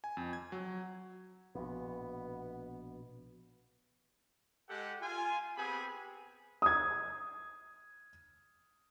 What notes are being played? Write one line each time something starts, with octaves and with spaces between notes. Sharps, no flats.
G#5
F2
G#6
F#3
A#1 B2 B3
G#3 G4 A4 F#5
F4 G#5
B3 C4 G4 G#4 G#5 B5
D#6 G#6